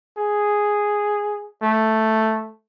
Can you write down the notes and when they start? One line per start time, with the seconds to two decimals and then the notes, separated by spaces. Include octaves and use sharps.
0.17 G#4
1.62 A3